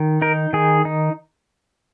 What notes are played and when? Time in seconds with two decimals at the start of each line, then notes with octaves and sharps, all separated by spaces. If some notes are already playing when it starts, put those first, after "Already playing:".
Already playing: D#3
0.21 D#4 A#4
0.53 D#3 G#4
0.85 D#4